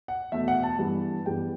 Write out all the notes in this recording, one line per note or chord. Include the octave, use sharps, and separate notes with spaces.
F#5
E2 B2 A3 E5
F#5
A5
G2 E3 G3 B3
G2 E3 G3 B3 G5